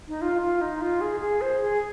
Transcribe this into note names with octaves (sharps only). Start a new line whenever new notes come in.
D#4
F4
F4
D#4
F4
G#4
G#4
C5
G#4